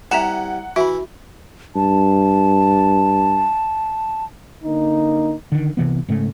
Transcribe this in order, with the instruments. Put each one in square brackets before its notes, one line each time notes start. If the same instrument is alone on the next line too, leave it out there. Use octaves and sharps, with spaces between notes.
[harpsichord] C2 G4 G#5 [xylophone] E5 A#5 E7 [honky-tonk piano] F#5
[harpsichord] E3 E4 [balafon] F#4 [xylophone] E5 B5
[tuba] G2 [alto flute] A5
[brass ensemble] D3 A#3 D#4
[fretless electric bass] D3 D#3
C2 C3 E3 B3
G#2 C#3 A3